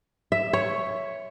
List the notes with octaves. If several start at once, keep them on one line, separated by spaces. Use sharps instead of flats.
E5
C#5